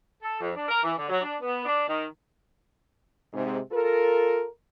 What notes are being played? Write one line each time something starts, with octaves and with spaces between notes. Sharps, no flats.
A4
F2
D4
A#4
E3
D3
F#3
D4
B3
D4
D#3
G#2 C3
F4 A4 A#4